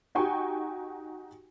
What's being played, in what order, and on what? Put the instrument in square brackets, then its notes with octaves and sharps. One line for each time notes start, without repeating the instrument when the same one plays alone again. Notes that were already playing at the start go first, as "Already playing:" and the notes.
[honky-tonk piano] D#4 F#4 G4 G5 G#5 C#6